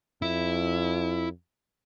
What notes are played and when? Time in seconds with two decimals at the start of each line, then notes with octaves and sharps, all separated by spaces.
0.22 F2 E4